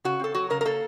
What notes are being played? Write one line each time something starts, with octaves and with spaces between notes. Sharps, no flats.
C#3 F#4
C4 A4
F#3 F#4
C#3 A#4
A#4
A#3 A4